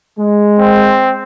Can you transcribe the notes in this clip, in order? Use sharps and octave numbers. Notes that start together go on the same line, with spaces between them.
G#3
C4